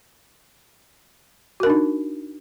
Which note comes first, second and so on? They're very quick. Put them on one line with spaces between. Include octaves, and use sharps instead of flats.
F#4 A#4 D4 D#4